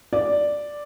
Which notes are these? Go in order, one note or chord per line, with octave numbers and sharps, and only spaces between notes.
D5